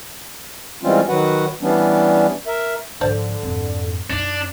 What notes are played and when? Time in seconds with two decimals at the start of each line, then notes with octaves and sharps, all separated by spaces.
0.83 E3 G3 G#3 C4 C#4 F4
1.09 D#3 F#3 F#4 B4 F#5
1.62 E3 G3 B3 C#4 D4
2.47 A#4 E5
3.01 G#2 D3 F3 C5 D5 A5
3.43 F2 G#2
4.10 F#2 D4 D#4